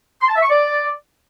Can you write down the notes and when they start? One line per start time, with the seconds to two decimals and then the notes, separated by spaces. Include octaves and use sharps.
0.22 C6
0.29 A5
0.36 E5
0.43 C#6
0.50 D5